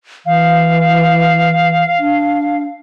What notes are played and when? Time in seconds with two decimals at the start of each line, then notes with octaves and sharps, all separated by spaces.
0.26 E3 F5
1.99 D4